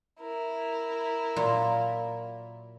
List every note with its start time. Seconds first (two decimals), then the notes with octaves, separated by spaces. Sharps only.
0.20 E4 A#4
1.36 A#2 F#3 F4